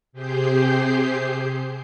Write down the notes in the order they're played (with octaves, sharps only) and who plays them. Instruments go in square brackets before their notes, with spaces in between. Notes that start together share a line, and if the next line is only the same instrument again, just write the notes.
[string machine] C3 G4 G#4 C5 G6 C7